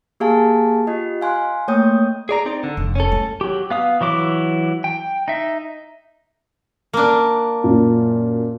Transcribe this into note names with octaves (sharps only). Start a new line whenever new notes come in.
A#3 G4 G#4 F5 G#5 A5
F4 G4 D#5
F5 G#5 C6 F#6
A3 A#3 C#5 G5 D#6 G6
G#4 D5 A#5
C4 D#4 D5
D3
F1 F2
C#4 A4
A3
F#3 G4
B3 F5 D#6
E3 F#3 E4 D6
G5
D#4 E5
A#3 D4
F#2 A#2